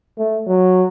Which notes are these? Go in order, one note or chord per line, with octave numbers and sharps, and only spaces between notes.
A3
F#3